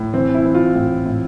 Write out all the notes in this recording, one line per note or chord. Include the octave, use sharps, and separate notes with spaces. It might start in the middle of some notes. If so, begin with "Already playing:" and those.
Already playing: A2
E3 C4
E4
E3
F4
A2
A2